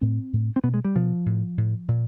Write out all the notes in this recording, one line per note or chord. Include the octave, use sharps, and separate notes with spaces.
A2 C4
A2
C4
B2 B3
G#3
G3
B2 F3
A2
A2
A#2